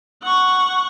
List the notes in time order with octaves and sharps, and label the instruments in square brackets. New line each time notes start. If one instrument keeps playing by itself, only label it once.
[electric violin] F#5 C#6